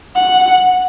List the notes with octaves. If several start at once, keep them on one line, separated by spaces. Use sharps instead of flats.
F#5